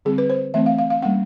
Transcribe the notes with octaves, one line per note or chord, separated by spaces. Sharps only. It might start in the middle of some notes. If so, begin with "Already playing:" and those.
D3 G3 C4 G#4
B4
C5
E3 A3 C4 E5
F5
F5
F5
G3 A#3 C#4 F#5